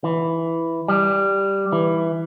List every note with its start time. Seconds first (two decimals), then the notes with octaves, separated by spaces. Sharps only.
0.04 E3
0.88 G3
1.73 E3